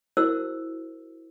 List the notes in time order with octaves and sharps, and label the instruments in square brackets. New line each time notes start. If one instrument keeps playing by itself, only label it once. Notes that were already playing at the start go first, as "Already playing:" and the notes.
[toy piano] E4 F#4 A#4 C5 E6